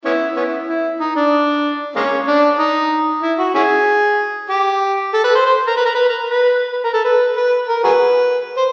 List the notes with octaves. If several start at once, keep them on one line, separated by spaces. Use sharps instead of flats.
B3 C#4 E4
B3 C#4 E4
E4
D#4
D4
G#3 A#3 C#4
D4
D#4
E4
F#4
C#4 E4 G#4
G4
A4
B4
C5
C5
A#4
B4
A#4
B4
A#4
B4
B4
A#4
A4
B4
B4
A#4
F#4 G#4 B4
C5